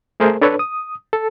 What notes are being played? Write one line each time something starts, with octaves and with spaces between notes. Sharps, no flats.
A3 G#4 A#4 C5
D4 A4 B4 C#5
D#6
A4